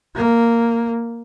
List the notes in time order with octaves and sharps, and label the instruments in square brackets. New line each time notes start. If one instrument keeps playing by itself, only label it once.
[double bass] A#3